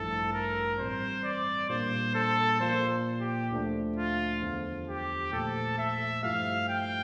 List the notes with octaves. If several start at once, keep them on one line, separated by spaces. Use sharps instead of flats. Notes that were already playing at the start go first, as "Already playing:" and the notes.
Already playing: A1 G2 F3 A3 E4 A4
A#4
A2 E3 G3 C4 C5
D5
A#2 G3 A#3 D4 C5
A4
A#2 F3 A#3 F4 C5
G4
D2 D3 F3 A3 D4
F4
E2 D3 F3
G4
A#2 F3 A3 A4
E5
G2 F3 A3 E4 G4 F5
G5